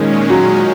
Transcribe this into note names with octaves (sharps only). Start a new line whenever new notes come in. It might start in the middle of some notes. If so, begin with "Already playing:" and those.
Already playing: A#2 D#3 G#3 C#4
F#3